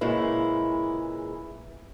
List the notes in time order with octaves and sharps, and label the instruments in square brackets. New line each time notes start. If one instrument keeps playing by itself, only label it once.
[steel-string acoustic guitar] A#2 C#3 E3 G#3 E4